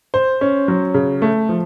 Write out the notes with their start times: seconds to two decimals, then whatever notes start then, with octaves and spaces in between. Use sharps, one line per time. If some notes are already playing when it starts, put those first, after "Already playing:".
0.14 C5
0.41 C#4
0.68 F#3
0.94 C#3
1.22 A3
1.49 F3